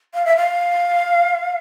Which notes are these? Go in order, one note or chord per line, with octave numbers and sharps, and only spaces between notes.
F5
E5
F5